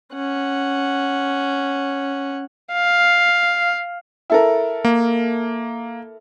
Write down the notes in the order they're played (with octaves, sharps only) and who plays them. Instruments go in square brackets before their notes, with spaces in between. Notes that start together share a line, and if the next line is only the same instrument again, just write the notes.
[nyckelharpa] C#4 F#5
[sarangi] F5
[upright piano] E4 A4 A#4
[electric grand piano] A#3